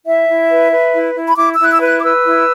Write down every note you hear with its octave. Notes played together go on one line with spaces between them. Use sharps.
E4 E5
E4
B4
B4
E4
E4
B5
E4 D6
E6
E4 F#6
E6
B4
F#6
D6
B4 E6
E4